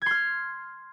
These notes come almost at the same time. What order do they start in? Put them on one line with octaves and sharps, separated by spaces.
G#6 C6 F6